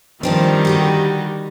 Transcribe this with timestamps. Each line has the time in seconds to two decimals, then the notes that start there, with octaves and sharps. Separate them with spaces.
0.23 D#3 F3 G3 C4 D4
0.65 D3 F#4 G4